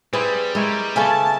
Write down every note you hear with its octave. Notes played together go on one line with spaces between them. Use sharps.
G3 C4 E4 G#4 B4
G#3 E4 A#4 C#5
C#3 A3 B3 C#4 E5 G#5 A5